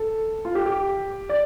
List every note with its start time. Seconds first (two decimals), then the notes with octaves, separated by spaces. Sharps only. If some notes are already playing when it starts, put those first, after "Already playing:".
Already playing: A4
0.45 F4
0.55 G4
0.66 G4
1.29 D5